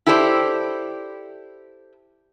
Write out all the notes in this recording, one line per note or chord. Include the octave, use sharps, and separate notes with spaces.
E4 G4 A4 C5 D5